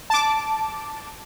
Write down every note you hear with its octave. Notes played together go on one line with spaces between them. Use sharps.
A5 D6